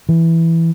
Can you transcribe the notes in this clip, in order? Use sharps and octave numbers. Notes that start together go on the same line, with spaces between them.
E3